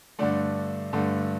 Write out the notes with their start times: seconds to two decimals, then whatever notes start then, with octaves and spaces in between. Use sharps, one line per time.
0.19 G2 D3 A3 D4
0.93 G2 D3 A3